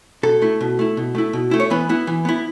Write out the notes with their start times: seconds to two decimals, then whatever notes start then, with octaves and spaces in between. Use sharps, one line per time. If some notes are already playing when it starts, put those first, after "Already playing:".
0.23 B2 A4
0.42 A3 E4
0.61 B2
0.79 A3 E4
0.97 B2
1.15 A3 E4
1.33 B2
1.51 A3 E4
1.60 C#5
1.70 E3 B3 B4
1.89 B3 E4
2.07 E3
2.25 B3 E4